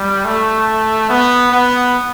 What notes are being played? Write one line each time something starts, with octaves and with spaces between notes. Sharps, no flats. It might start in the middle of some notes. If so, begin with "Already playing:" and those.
Already playing: G3
A3
B3
B3